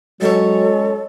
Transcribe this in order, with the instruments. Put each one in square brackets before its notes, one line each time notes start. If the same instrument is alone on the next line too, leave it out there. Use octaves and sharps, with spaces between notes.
[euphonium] F#3 [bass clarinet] G#3 [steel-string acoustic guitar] C#4 C#5 [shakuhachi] A4